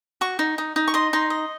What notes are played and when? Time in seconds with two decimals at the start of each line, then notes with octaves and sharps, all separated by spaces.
0.21 F#4 C#6
0.39 D#4
0.58 D#4
0.76 D#4
0.88 C#6
0.94 D#5 C6
1.13 D#4 C6
1.30 D#5